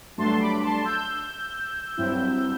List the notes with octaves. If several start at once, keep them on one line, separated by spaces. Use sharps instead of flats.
G2 F#3 A3 D4 A5 C6
B5 D6
A5 C6
E6 G6
G2 F#3 C4 E4